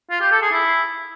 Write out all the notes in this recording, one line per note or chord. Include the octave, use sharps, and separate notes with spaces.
F4
G4
A4
G#4
E4